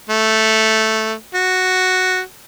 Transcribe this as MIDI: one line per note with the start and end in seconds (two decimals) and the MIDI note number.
0.10 1.13 57
1.35 2.20 66